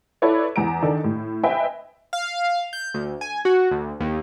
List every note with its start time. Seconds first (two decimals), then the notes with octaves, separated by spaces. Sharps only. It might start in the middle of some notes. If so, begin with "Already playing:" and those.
0.22 E4 A4 B4 C#5 D5
0.56 E2 A#5 D7
0.82 D#3 D4 D#4 A4
1.04 A2
1.43 B4 C5 D#5 E5 G5 G#5
2.13 F5
2.73 G6
2.94 D2
3.21 G#5
3.45 F#4
3.71 D2
4.00 D#2